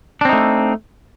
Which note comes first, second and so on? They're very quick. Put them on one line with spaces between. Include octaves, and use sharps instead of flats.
D4 C4 D#4 A3